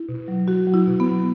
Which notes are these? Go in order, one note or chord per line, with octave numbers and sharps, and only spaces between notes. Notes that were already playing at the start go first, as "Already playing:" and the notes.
Already playing: E4
B2
F#3
F#3 F#4
F#3
E4
B2
B3
F#3